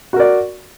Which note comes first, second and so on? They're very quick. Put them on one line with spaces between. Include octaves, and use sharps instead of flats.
F#4 A#4 D5